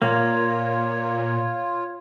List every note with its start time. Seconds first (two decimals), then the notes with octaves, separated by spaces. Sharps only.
0.02 A#2 A#3 F4 C#5